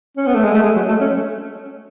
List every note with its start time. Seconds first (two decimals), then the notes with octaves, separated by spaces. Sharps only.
0.17 C#4
0.26 B3
0.35 A3
0.44 G#3
0.54 A3
0.63 G#3
0.76 F#3
0.88 A3
1.01 C#4